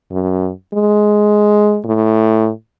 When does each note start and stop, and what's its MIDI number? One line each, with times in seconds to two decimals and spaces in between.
0.11 0.50 42
0.74 1.79 56
1.85 2.50 45